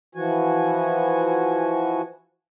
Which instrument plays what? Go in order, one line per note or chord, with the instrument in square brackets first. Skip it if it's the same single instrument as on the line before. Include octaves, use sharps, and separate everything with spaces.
[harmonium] E3 F3 F#4 G#5